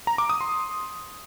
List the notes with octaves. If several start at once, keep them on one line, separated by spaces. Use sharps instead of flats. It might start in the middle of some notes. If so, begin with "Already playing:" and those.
A#5
D6
D#6
C6